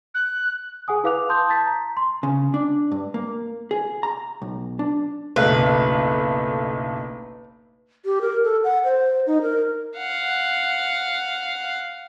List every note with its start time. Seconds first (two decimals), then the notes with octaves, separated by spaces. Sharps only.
0.14 F#6
0.88 G#4 F#5 G#5 D#6
1.04 E4 B4 F5 D6 F#6 F7
1.29 A5 C6 D#6 G6
1.49 A5 A6 B6
1.66 A#5
1.97 C6
2.23 C#3
2.54 D4
2.91 G2
3.14 A#3
3.71 G#4
4.03 A#5
4.42 B1
4.79 D4
5.36 F#1 B1 A3 B4
8.05 G4
8.21 A#4
8.44 A4
8.64 F#5
8.84 C5
9.27 D#4
9.42 A#4
9.98 F5 F#5